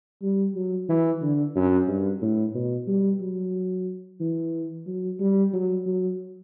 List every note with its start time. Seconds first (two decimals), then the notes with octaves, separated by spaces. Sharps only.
0.22 G3
0.55 F#3
0.89 E3
1.21 D3
1.55 F#2
1.87 G2
2.22 A2
2.54 B2
2.87 G3
3.20 F#3
4.21 E3
4.87 F#3
5.20 G3
5.53 F#3
5.86 F#3